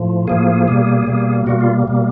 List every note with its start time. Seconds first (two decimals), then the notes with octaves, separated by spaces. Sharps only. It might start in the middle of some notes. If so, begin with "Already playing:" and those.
Already playing: A2 F3
0.27 A2 F3 A#3 G#4
0.68 B2 G3 A#3
1.07 B2 G3 A#3
1.46 B2 G3 A#3 F#4
1.60 F4
1.87 B2 G3 A#3